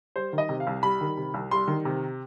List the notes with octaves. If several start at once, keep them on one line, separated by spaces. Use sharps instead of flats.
G3 C5
D#3
D#5
C3
F5
C2
G3 B5
D#3
C3
C2
G3 C6
D#3
C3